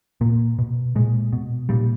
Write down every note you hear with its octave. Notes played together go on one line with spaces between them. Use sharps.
A#2 A#3
B2
A#2 G#3
B2
A#2 G3